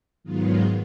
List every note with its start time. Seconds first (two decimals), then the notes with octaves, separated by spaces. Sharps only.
0.24 G#2 D#3 F#3 G#3 B3 F4